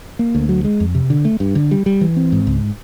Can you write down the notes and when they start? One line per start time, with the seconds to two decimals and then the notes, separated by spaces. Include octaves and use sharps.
0.19 A#3
0.35 D2
0.49 F#3
0.65 G#3
0.80 F2
0.95 C3
1.10 D3
1.25 A3
1.40 G2
1.55 D3
1.71 G3
1.86 G3
2.01 E3
2.16 C4
2.32 G#2
2.47 C#2